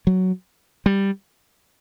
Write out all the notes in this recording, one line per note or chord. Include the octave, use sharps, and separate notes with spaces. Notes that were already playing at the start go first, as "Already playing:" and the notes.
F#3
G3